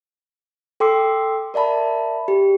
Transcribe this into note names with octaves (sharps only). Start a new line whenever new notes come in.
A4 G5 C6 D6 E6 C7
A#4 D5 E5 A5 B5
G4